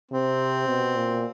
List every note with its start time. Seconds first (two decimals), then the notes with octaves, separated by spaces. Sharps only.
0.12 C3 C4
0.68 B2
0.96 A#2